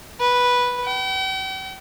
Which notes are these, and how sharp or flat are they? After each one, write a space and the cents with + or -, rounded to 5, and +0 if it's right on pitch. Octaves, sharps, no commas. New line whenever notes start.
B4 -5
G5 -45